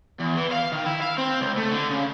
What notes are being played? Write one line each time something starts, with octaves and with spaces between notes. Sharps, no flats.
E2
E3
F5
D#3
E4
F5
C4
C#2
A3
D3
C#3